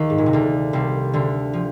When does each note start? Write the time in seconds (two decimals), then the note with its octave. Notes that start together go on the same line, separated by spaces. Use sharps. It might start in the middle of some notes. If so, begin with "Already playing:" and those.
Already playing: D#2 D#3
0.10 G#2
0.18 A#2
0.26 C3
0.33 D2 D3
0.73 C2 C3
1.13 D2 D3
1.53 F3